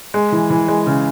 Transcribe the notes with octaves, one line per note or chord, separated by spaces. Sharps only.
G#3
E3
E3
G#3
C#3